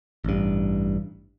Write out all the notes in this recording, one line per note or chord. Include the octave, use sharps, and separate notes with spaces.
A1 G2